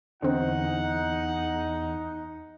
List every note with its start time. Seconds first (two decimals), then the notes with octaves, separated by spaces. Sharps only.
0.22 E2 D3 C4 D#4 F#5